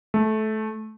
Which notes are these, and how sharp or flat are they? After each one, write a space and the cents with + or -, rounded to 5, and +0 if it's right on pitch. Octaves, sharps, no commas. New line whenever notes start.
A3 -20